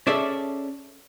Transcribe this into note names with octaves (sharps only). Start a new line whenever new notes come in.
C#4 G#4 A4 D5 E5